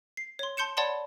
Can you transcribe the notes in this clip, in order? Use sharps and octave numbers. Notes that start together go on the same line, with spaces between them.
C7
C#5 C6
A5 C6 G6 C#7 E7
C#5 D5 F#5 A5 B5 C6